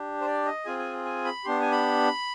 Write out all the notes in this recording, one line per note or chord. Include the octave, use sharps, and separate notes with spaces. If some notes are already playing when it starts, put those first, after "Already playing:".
Already playing: D4 G4
C5
D5
D#5
C4 F4 G#4 G#5
G#5
G#5
B5
B3 D4 G4 C6
G#5
B5